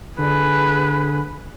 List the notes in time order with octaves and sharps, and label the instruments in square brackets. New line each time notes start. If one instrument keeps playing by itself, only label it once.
[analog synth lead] D3 [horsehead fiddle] G#4 B4